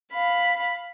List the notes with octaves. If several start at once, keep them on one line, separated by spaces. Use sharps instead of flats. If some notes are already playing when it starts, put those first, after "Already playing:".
F5 B5